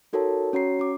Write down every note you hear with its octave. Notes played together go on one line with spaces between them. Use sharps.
D#4 F#4 A4 A#4 C#5 A5
C#4 F#4 C#5 A#5 C7
C#4 D6